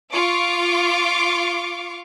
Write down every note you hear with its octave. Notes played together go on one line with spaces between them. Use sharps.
F4 F5 C#6 D6